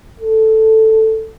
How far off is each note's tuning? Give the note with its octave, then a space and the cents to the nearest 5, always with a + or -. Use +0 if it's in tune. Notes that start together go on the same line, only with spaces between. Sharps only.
A4 +0